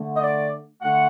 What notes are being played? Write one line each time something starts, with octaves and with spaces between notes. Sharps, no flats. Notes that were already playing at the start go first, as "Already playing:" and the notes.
Already playing: D3 A3
D#5
D5
D3 A3 F#5